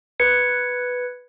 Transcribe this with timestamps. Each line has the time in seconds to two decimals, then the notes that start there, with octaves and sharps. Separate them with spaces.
0.20 B4 G#6 C#7